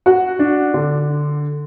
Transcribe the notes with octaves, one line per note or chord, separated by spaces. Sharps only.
F#4
D4
D3